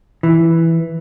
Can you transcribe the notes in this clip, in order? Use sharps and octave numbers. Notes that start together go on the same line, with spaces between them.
E3